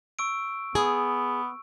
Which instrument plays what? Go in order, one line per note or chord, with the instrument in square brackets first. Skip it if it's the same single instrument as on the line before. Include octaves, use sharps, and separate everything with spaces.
[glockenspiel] C#6 E6 D7
[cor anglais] B3 [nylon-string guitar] G#4